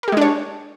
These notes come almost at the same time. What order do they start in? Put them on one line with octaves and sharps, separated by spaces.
A#4 G4 G#3 D4 C#5